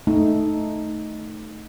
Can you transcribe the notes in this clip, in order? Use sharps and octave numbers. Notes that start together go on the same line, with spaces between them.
A3 D#4